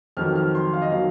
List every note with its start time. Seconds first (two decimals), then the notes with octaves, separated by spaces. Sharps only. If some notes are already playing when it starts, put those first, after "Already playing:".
0.17 F2 D#3 F#3 F6
0.35 F6
0.55 C6
0.73 F5
0.82 D#5
0.92 D#3 F#3 F5